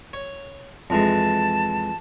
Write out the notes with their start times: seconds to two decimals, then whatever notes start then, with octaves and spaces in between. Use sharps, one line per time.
0.13 C#5
0.90 F2 E3 G#3 A5